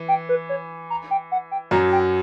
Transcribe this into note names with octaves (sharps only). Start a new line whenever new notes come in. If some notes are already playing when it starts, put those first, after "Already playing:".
Already playing: E3
G5
B4
C#5
A#5
G5
F#5
G5
F#2 F#3 A#5
G5